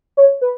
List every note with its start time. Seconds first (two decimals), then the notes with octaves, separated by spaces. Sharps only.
0.17 C#5
0.41 B4